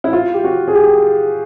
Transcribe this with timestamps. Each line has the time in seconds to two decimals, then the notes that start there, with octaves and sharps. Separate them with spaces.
0.04 E4
0.13 F4
0.34 G4
0.44 F#4
0.68 G#4
0.75 G4